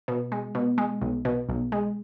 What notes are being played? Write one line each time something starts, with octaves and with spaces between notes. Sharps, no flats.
B2
G#3
B2
G#3
B1
B2
B1
G#3